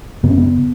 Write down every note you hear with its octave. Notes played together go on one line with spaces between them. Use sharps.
F#2 C#3 B3
C#4
B3